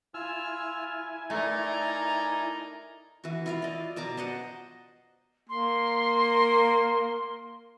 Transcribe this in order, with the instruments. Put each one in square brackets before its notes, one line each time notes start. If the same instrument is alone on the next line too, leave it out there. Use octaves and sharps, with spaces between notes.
[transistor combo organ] E4 G#5 [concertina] F4 E6 F6
[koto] A3 [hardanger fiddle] D#4 A#4 [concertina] D5 A#5
[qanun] E3 F#4
E4 F4 F5
D5 D#5
B2 D5 A5 A#5
C5 D#5 F#5
[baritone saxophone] A#3 [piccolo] C6